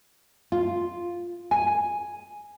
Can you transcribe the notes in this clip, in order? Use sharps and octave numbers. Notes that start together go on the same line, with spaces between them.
F4
G#5